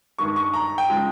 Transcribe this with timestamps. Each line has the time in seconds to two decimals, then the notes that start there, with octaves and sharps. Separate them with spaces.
0.18 G2 D#3 G#3 C#6
0.36 C#6
0.54 A#5
0.78 G5
0.89 C#3 F3 G#3